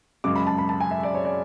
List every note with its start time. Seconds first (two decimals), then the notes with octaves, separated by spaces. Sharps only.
0.24 F#2 C#3 G#3 D6
0.36 B5
0.47 A5
0.58 B5
0.69 A5
0.80 G#5
0.91 E5
1.03 D5
1.15 C#5
1.25 D5